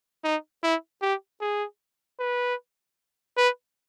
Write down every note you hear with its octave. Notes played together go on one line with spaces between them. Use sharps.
D#4
E4
G4
G#4
B4
B4